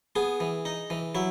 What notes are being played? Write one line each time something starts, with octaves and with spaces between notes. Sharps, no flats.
B3 G#4
E3
D#4
E3
F#3 E4